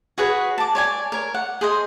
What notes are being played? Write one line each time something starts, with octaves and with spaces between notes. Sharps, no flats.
F#4 G#4 B4 C#5
A5 D6
C#5 D5 G#5
A#4 C#5
F#5
G#4 C5 D#5